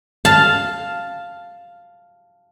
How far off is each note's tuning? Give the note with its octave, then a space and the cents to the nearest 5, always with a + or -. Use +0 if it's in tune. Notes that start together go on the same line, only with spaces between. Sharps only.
F5 +0 A5 +0